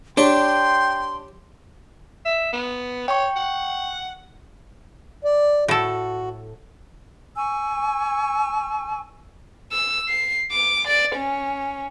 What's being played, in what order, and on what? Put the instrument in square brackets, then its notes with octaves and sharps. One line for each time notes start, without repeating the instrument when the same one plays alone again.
[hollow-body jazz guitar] D4 [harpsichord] G4 C#5 [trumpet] G5 [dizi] C6
[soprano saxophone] E5
B3
[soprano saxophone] C#5 [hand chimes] G5 C#6
[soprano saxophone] F#5
[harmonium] D5
[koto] A2 A4 [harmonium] F#4
[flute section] G#5 C#6 E6
[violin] E6
C7
D6
D5
C#4